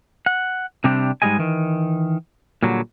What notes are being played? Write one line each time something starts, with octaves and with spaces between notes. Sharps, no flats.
F#5
C3 G3 C4 D4 G4
G#2 C3 G3 G#3 D#5 G#5
D#3 E3
A#2 D3 F#3 G3